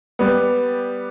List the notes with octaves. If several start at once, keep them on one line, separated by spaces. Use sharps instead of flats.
G3 B3